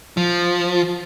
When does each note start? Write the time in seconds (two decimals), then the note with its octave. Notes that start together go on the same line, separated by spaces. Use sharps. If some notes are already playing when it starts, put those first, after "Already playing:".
0.17 F3